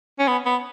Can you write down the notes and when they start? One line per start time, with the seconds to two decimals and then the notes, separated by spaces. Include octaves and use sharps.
0.19 C#4
0.28 B3
0.46 B3